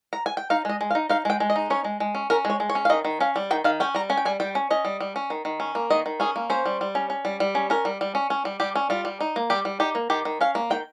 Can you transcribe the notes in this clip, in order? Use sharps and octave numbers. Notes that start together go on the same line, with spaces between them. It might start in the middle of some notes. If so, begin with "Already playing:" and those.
A#5
G#5
G5
D#4 F5
G#3 D#5
G#3
F5
D#4
D#4 F5
G#3 G5
G#3
D#5
D#4
C#4 C#5
G#3
G#3
C#4
C#4 A#4
G#3 C#5
G#3
C#5
C#4
F5
D#3 D#5
D#3
C#4 F5
G3
D#3 G5
D#3 F5
C#4 G5
G3 A#5
C#4 G#5
G5
G3 G#5
G3 G5
C#4
C#4 D#5
G3
G3
C#4
D#3
D#3
C#4
A#3
D#3 D#5
D#3
C#4 G#4
A#3
C#4 C5
G3
G3
C#4
C#4
G3
G3
C#4
C#4 A#4
G3
G3
C#4
C#4
G3
G3 G4
C#4
G3 F4
G3
D#4
A#3
G3 G4
G3
D#4 G4
A#3
D#3 G4
D#3
C#4 F5
A#3
D#3 G5